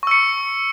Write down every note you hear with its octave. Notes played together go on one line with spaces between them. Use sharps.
C#6 E6 C#7